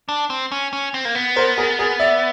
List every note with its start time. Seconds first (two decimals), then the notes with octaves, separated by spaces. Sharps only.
0.09 D4
0.30 C4
0.52 C#4
0.73 C#4
0.94 C4
1.05 A#3
1.15 B3
1.36 A#4 C5
1.58 G#4 A#4
1.79 G#4 A#4
2.00 D5 E5